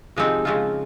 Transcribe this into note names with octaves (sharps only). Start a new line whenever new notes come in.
C3 F3 G#3 C4 D#4
C#3 F3 G#3 C4 F4